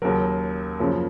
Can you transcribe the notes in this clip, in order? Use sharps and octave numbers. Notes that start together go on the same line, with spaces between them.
D#2 C#3 F#3 A#4
F#2 C#3 F3 A#3